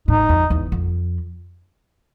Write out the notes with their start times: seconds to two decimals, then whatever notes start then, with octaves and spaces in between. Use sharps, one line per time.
0.08 A2 D#4
0.29 F2
0.50 E2
0.72 F2